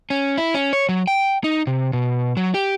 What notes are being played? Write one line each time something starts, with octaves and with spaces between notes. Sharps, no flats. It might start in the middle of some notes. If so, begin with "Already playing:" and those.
C#4
E4
C#4
C#5
F#3
G5
D#4
C3
B2
F#3
G4